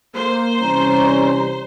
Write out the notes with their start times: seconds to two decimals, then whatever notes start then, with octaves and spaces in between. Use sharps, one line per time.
0.15 A#3 C5
0.61 C2 E3 G3 C#4 A#5